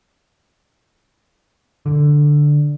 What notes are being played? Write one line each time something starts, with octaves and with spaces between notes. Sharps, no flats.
D3